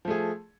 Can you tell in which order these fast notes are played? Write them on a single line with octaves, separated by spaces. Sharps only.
F3 A3 G#4